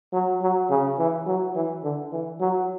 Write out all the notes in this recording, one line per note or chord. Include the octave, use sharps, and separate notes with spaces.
F#3
F#3
C#3
E3
F#3
E3
D3
E3
F#3